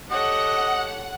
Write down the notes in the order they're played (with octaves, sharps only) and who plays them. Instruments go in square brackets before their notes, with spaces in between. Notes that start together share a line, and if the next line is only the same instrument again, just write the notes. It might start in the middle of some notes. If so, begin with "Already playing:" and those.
[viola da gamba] G4 A4 C#5 [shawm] D#5 [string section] F#5